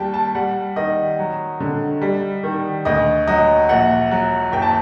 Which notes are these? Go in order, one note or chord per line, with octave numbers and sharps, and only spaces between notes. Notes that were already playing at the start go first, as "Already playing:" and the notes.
Already playing: D#2 G3 G5 A5
A5
G3 F#5
D#3 D#5
F#3
D3
G3
D#3
D2 D#5
F#3 D#5
A#1 F#5
F#3
F#1 G5
A5